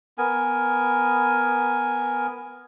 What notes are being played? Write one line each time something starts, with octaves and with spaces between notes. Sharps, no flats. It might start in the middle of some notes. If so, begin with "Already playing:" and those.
B3 A#4 G#5